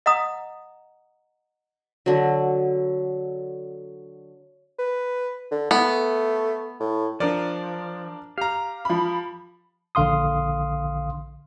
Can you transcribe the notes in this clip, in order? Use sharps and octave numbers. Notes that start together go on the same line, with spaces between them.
D#5 F#5 A#5 D#6
D3 F#3
B4
D3
A3 B3
A2
F3 D4 A#4 D5
G4 F5 A#5
F3 B5
A#1 D3 F5 C6 D#6